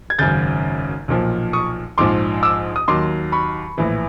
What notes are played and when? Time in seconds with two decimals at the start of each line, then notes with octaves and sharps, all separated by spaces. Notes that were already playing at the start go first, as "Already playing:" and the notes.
0.10 G#6
0.19 G#1 F#2 C#3 G6 A6
1.08 B1 A#2 F3
1.53 C#6 D#6
1.98 A#1 G#2 F3 C6 D6
2.43 D6 E6
2.76 D#6
2.88 D#2 D#3 F#3 C6 D6
3.32 B5 C#6
3.78 A#1 A2 E3